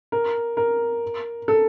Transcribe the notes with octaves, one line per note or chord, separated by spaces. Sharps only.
A#4
A#4
A4